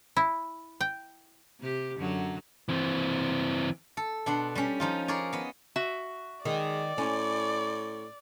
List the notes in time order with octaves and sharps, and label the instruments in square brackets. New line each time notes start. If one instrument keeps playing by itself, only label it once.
[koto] E4
G5
[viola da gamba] C3 G4
F#2 D3 F#3
[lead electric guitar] E3 C4
[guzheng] A4
B2 D4 F#5 C6
G3 C#4
F3 D#4 F4
G#4 A#4 C#5 D5
B3 D#5
[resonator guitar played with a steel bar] F#4 E5
[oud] D#3 [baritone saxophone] G#3 [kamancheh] D5
[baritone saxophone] A2 [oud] C#4